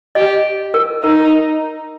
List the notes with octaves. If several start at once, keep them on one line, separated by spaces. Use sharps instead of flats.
G4 D#5
A#4
D#4 A#4